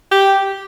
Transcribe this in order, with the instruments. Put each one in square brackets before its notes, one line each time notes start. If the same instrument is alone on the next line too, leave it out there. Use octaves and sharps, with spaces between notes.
[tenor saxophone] G4